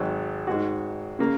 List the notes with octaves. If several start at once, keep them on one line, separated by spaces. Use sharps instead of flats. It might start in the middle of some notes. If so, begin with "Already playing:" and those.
Already playing: G#1 G#2 F#3
G#2 G#3 F#4
C#3 A#3